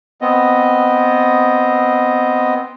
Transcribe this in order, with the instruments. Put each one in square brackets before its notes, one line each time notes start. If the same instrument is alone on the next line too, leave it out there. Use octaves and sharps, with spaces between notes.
[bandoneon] B3 C4 D#5